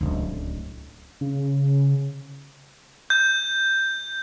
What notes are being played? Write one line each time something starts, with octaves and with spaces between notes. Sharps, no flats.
D1 C#2
C#3
G6